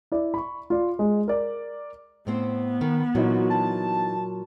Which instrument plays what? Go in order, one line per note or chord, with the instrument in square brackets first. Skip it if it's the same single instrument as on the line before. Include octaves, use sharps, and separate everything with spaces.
[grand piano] E4 D5
B5 C#6
F4 D5
G#3
A#4 D5
[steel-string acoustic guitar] A2 C4 C5 [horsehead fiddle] B3
[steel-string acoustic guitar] D#3
[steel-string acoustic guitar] A#2 F#3 [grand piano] E3 D#4 [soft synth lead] F#4
[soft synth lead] A5